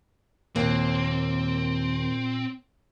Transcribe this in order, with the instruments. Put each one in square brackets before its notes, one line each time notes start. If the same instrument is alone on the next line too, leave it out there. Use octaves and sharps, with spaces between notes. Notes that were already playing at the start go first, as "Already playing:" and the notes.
[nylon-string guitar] D#2 [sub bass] A#2 [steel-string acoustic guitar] A#3 [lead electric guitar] C4